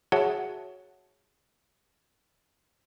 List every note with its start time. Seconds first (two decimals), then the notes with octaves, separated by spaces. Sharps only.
0.12 F#4 G#4 C#5 E5 F#5 A5